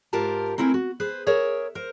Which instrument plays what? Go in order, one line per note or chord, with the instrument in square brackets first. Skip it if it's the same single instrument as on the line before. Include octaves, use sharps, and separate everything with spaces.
[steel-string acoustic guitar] G#2 F4 G4 A#4 A5
A3 C4 E4 A#4 G#5
F#4
G#4 B4 C5
G#4 A#4 C#5 E5
A#4 C5